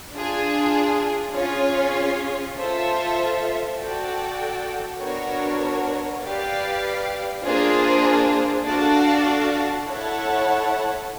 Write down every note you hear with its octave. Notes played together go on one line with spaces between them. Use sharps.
D4 F4 G#4
C#4 F4 G#4 C#5
F4 A4 C5 E5
F#4 A4 D5 G5
B3 D4 F#4 A#4 C#5
G4 B4 D5 F5
A#3 D4 F4 G#4 C5
D4 F#4 A4 D5 F5
E4 A4 C#5 F#5